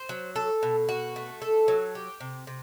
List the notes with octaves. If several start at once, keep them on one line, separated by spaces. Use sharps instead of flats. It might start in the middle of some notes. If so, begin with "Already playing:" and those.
Already playing: C5
F#3
A4
B2
F#4
A3
A4
F#3
G4
C3
C3